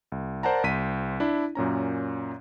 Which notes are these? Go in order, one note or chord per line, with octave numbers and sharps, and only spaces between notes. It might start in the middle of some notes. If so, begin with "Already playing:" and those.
C2
A#4 C5 D5 F#5 A5 A#5
C2 C5 B6 D#7
D4 E4
F#2 A#2 C#4 A#5